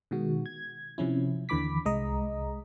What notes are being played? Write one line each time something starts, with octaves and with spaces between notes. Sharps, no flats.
B2 D#3 G#3 F#4
G#6
C3 F3 C#4 E4
D#2 D3 E3 B5 D6 B6
C2 G#3 D#5 A#5